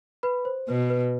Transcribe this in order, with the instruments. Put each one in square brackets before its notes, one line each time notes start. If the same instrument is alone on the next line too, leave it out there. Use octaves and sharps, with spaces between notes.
[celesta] B4 B5
C5
[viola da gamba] B2 [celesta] B4
[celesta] B4